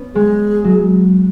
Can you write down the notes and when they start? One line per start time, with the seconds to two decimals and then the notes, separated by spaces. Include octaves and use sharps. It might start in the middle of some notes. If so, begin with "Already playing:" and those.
Already playing: B3 C#4
0.15 G#3 G#4
0.64 F#3